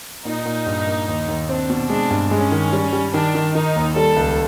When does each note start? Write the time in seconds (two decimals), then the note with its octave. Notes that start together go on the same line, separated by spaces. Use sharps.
0.25 A#2 D#4
0.46 A#2
0.66 G2
0.87 A#3
1.08 D#2
1.28 D#2
1.49 C4 D4
1.70 B2
1.90 G#3 D4
2.10 G2
2.31 G#3 C#4
2.52 D#3
2.73 G3
2.93 G3
3.14 D#3 D4
3.35 D#3
3.55 D#3 D#4
3.76 D#2
3.96 G3 A4
4.16 C#2